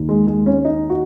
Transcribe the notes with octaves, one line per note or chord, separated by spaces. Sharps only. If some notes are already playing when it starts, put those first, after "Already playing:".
Already playing: D#2 D#3
G#3
G#3
C#4
D#4
F#4